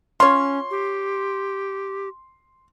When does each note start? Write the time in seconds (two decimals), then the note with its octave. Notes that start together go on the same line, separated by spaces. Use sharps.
0.20 C#4 F4 C#5 C6
0.71 G4